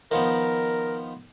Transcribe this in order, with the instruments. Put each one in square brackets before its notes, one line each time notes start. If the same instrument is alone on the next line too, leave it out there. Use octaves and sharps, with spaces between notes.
[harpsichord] D#3 F3 B3 [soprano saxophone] A#4